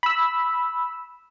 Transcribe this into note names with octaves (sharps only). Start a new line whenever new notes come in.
B5 E6